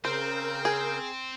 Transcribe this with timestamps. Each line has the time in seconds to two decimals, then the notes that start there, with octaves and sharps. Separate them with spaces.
0.05 C#3 C4 A#4 C5 G6
0.65 G#4